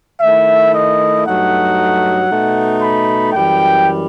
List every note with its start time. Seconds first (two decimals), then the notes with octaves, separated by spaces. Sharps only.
0.21 D#3 A3 E4 E5
0.73 D#5
1.25 G2 F#3 A3 D#4 F#5
2.29 B2 A3 D#4
2.82 B5
3.33 F#2 E3 G3 G5